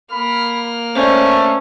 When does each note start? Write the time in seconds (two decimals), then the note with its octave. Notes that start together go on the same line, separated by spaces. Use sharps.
0.12 A#3 B5 F6
0.95 A3 C#4 C5 D5